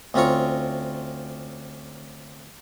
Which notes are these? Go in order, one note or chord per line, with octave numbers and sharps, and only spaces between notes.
D2 C4 C#4 F4 A#5 C#6